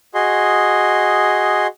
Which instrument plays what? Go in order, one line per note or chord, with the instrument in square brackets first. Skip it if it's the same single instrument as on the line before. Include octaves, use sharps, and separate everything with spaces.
[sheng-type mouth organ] F#4 G#4 D#5 C6